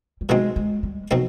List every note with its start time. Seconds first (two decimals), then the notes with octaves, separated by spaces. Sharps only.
0.21 G3
0.29 B2 F#3 G#3 A3 C4 D#4
0.56 G#3
0.83 G3
1.11 B2 F3 F#3 A3 C4 D#4